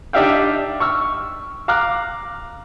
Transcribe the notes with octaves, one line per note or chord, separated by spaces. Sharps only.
D4 D#4 G4 E5 F5 G5
C#6 E6 F6
F5 A#5 D6 F6 F#6